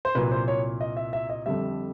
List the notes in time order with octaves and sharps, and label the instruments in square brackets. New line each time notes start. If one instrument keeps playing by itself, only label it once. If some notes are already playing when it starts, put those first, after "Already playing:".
[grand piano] C5
C2 A#2 F#3 B4
C5
C#5
D#5
E5
E5
D#5
F2 D3 G3 E5